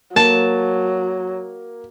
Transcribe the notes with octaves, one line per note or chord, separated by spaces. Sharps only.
F#3 A#3 A5